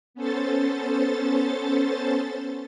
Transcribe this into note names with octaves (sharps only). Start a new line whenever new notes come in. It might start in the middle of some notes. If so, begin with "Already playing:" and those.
B3 C#4 A4 C5 A6